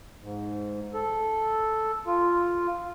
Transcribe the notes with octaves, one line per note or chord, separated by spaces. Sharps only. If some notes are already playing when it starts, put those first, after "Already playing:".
G#2
A4
F4